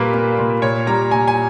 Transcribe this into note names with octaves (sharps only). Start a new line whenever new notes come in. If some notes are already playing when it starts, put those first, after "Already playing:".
Already playing: A#2 G3 A#3 B4
A#3
A#2
A#2 C#5
G3 A#5
A#2 G#5
G#5